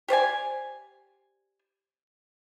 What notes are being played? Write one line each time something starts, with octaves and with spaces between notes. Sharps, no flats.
G4 C5 D5 G#5